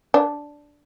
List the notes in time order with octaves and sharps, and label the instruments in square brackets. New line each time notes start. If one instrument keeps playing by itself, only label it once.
[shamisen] D4